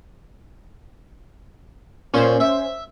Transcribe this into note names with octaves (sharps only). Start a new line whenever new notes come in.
A#2 C#4 C5 C6
E5